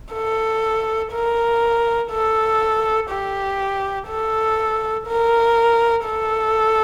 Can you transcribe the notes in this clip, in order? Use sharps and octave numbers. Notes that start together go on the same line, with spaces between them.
A4
A#4
A4
G4
A4
A#4
A4